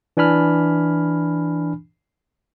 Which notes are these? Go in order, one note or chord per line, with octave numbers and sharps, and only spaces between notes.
E3 D4 G#5 B5 F6